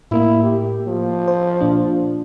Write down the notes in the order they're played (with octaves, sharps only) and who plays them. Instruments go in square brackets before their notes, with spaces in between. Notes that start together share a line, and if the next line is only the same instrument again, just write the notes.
[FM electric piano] A2 A#3 [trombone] E4
[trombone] G4
F3
[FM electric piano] C5
A#2 D4